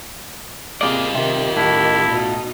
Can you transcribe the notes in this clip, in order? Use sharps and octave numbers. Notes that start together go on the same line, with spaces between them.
C3 A#3 F4 G#4 D5 D#5
C3 D#3 G4
A2 E4
B2 D#4